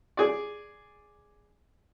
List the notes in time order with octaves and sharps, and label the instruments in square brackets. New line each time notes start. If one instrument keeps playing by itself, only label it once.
[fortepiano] G#4 D5